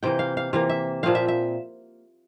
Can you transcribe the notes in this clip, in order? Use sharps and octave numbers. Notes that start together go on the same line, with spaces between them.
C3 E3 A#3 G5
F5
F5
C3 E3 A#3 F5
E5
A#2 F3 C4 F5
E5
E5